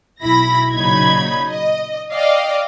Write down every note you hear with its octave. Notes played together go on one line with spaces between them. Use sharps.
B1 E4 B5 A#6
A#2 C#3 F#3 D#4 B5 G#6
D#5
D5 D#5 F5 G5